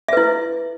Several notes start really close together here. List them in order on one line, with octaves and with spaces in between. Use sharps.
E5 B4 E4